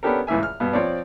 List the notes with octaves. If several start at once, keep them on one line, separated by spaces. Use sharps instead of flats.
B3 C#4 D4 G4 A4 A#4
C#2 A2 E3 E5 G#5
F6
G2 B2 B3
F3 C4 C#5 D5